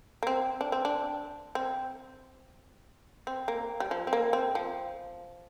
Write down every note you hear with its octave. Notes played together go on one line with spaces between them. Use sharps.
A#3
C4
D4
C4
D4
C4
C4
A#3
G3
F3
C4
A#3
C4
F3